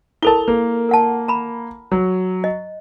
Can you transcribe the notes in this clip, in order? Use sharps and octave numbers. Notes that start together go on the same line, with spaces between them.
E4 A4 A#4 A5 F7 G7
A#3
A#4 F#5 A5
A#5 B5
F#3
D#5